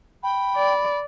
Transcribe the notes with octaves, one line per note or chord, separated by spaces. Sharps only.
G5 B5
D5